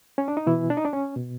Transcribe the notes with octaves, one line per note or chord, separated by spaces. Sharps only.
C#4
D4
D#4
B2 E3 E4
D4
D#4
D4
C#4
B2